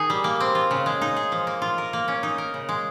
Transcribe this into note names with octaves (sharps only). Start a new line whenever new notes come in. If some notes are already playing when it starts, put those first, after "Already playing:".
Already playing: D#3 D#4 G#4
G3
A#3
C4
F4
C#3
G#3
D#4
G#4
F3
A#3
F4
A#4
A#3
C#4
D#4
A#4
C#3
G#3